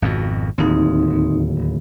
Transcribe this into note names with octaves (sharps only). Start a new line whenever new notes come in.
G#1 F2 B2
D1 D#2 C4 D#4